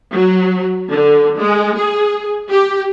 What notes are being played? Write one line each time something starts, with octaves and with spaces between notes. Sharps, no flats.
F#3
D3
G#3
G#4
G4